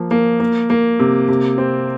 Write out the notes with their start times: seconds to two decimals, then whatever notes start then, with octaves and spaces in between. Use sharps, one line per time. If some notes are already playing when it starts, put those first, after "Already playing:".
Already playing: F3 A#3
0.11 A#3
0.40 A#3
0.70 A#3
0.99 C3
1.29 C3
1.58 C4